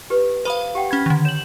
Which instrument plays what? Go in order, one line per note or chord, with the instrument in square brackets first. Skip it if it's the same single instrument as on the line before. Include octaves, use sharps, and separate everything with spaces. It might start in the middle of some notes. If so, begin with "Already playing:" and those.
[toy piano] G4 B4
[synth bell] B4 F5 [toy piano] C5 B5 D#6
[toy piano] G4 F#5 G5
[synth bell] C#4 B5 G#6
D3 D#3
[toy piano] C#5 [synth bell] E7 F#7